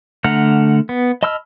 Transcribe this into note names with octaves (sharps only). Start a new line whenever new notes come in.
D3 A3 F#5 A#5 F6
B3
D#5 A5 B5 E6 F6